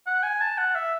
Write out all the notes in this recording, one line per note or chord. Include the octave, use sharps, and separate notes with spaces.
F#5
G#5
A5
F#5
E5